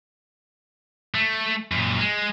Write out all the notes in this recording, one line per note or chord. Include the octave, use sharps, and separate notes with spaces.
A3
F#2 A#2
G#3